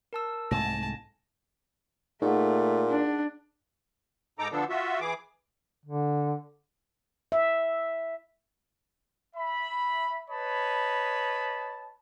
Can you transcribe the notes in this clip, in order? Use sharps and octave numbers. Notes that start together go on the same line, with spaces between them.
A#4 A5 E6
C2 G#2 A3 G#5 A5 A#6
A#2 A3 D#4 G#4 F#5
D4
G#2 D#4 A4 A#5 D6
D3 F3 B3 D4 A4
F4 F#4 E5
E3 G#4 D6
D3
E5
E5 B5
B4 C#5 D#5 A5 B5